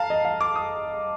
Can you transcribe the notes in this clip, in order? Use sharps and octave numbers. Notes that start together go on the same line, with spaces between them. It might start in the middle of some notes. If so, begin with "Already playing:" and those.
Already playing: F5 A5 A#5
D#5
F5
D6
D#6